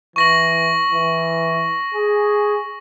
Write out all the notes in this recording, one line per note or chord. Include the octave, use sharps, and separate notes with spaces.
E3 C#6 A#6 F#7
E3
G#4